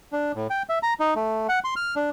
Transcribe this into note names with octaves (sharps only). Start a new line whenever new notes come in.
D4
A2
G5
E5
A#5
D#4
A3
F#5
C6
F6
D4